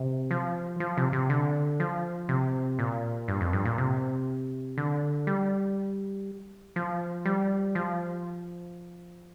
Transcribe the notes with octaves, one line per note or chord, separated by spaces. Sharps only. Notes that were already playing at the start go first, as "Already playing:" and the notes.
Already playing: C3
F3
F3
C3
C3
D3
F3
C3
A#2
G2
F2
G2
A#2
C3
D3
G3
F3
G3
F3